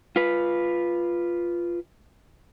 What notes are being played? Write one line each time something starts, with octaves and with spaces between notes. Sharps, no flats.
F4 B4